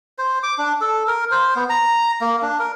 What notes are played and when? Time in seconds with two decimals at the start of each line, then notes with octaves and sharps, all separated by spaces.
0.18 C5
0.43 D6
0.58 D4
0.81 A4
1.07 A#4
1.31 C5
1.56 B3
1.70 A#5
2.21 A#3
2.42 D4
2.59 A#4